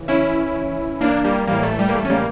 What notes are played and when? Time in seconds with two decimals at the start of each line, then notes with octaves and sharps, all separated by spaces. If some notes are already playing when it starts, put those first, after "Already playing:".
Already playing: C#3 E3
0.08 C#4 E4
1.01 A#3 D4
1.24 G3 A#3
1.47 A2 E3 G3 A#3
1.63 A3
1.79 G3
1.89 A#3
1.95 A3
2.05 C#4
2.09 G3 A#3